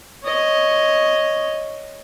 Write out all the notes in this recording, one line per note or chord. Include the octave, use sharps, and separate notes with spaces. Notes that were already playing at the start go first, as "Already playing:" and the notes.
C#5 D#5